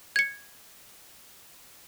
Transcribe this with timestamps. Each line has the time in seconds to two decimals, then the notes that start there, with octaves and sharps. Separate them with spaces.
0.16 G#6 C#7